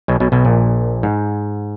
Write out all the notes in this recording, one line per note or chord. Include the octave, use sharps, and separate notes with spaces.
B1 B2
B1 B2
B1 B2
A#1 A#2
G#2